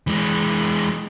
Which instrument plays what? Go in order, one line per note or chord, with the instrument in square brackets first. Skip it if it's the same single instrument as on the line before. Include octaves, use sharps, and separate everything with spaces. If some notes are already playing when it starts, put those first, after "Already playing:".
[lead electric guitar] E3 G#3